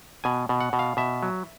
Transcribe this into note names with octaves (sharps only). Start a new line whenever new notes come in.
B2 G#5
B2
F#5
B2
F5
B2 E5
F#3